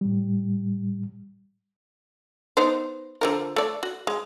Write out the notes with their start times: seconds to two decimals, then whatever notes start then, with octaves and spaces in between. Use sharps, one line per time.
0.01 A2 G3
2.57 B3 D#4 C5
3.21 D3 F3 A#4
3.56 A3 D5
3.83 F#4
4.07 G#3